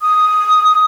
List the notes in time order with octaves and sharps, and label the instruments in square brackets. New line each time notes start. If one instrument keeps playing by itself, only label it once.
[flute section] D#6